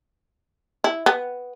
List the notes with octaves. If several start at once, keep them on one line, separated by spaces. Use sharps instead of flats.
E4
B3